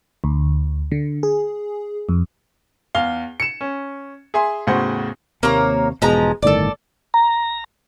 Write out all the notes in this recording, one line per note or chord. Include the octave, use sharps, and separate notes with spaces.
D2
D3
G#4
F2
E2 F5 G7
C#7 E7
C#4
G#4 E5 G#5 C6
E2 A2 C#3 F#4 C5 F#5
D#2 C3 A#3 C#5 A#5
E1 G#2 B2 F3 G#3 A#5
G1 A2 D#3 A4 D5
A#5